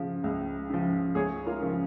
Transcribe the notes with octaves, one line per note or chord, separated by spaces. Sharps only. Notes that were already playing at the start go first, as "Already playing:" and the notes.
Already playing: C#3 F3
C#2
C#3 F3
C#2 G#4 C#5
F4 A#4
C#3 F3